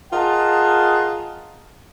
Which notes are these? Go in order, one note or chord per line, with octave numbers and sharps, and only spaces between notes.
F4 G#4 A#4 D#5 F#5 A5